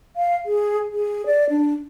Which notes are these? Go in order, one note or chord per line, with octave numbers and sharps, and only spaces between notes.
F5
G#4
G#4
D5
D4